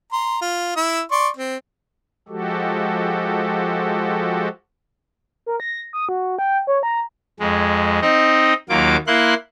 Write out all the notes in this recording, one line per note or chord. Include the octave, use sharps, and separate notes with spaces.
A#5 C6
F4
E4 E6
D5 C6 C#6
C4
F3 G#3 F#4 G4 A4
A#4
A#6
D#6
F#4
G5
C#5
A#5
F2 G#3
C4 D#4 D#5
D#2 F#3 A#3 F4 D6
A#3 E4 C6 F#6